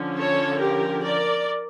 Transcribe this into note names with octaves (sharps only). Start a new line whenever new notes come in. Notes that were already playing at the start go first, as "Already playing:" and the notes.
Already playing: D3 F3 C#4
A4 C#5
G4 A#4
A#4 D5